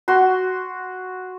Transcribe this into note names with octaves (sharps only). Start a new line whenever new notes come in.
F#4 C6